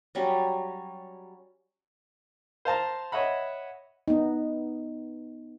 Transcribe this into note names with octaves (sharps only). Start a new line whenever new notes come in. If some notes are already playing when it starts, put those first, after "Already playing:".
F#3 G3 C#4
C5 F5 A5 A#5
C#5 D#5 E5 F#5 B5
B3 D#4